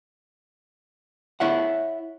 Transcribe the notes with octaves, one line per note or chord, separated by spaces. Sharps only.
E4 C#5 E5 F#5